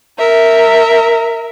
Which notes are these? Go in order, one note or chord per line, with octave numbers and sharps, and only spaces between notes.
A#4 E5